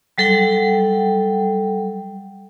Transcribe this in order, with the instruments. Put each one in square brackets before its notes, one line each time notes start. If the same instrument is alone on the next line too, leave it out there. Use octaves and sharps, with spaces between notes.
[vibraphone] F#3 G3 A4 F#5 G5